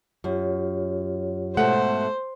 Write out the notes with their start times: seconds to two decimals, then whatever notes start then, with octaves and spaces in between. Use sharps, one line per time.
0.24 F#2 F4 G4 C#5
1.57 G#2 B2 A3 C5 F#5